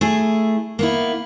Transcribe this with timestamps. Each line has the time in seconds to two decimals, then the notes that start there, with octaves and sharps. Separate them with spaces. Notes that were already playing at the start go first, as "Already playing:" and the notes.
0.01 A3 E4 G#4
0.79 A#3 B3 E4